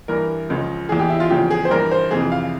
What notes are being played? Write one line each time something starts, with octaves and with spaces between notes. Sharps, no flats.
G2 E3 A#4
C#2 C#3 F3
E2 E3 G#4
G4
E4
F4
E2 C#3 F3 G4
G#4
C5
G2 E3 A#4
C5
F2 C3 E3 G#4
F5